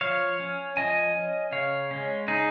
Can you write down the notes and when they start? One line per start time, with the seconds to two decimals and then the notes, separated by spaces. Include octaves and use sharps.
0.01 F3 C#5 F5
0.40 C#4
0.77 F3 D#5 G#5
1.14 C#4
1.52 C#3 C#5 F5
1.91 G#3 C#4
2.28 C#3 D#4 G#4